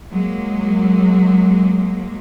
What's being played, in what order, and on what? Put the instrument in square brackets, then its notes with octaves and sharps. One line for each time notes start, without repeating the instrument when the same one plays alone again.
[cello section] F#3 G#3 A#3